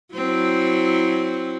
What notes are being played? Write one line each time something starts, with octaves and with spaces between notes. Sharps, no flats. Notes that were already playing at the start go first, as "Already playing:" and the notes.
F#3 C4 E4